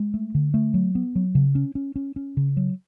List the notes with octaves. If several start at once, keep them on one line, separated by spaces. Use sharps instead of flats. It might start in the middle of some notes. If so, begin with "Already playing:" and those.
Already playing: G#3
A3
D3
A3
F#3
B3
F#3
C#3
C#4
C#4
C#4
C#4
C#3
F#3